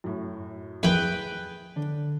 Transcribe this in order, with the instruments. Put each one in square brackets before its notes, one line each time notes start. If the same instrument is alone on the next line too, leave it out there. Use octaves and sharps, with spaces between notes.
[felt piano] F#2 A2
[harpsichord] F2 D#3 [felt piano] E4 G#4 [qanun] B4 G5
[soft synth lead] D3 [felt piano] D4